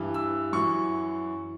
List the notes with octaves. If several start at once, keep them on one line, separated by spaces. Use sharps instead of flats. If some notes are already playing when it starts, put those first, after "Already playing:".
Already playing: G2 E3
E6
F#2 E3 C#6